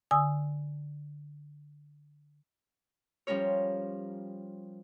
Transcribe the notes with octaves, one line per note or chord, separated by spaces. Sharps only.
D3 G#5 D#6 E6
F3 G3 C#4 A#4 C#5